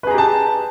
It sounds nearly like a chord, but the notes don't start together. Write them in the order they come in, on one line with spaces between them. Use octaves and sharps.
B4 G#4 A#5 G4 A5